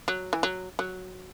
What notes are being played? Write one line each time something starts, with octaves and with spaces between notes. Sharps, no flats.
F#3
E3
F#3
F#3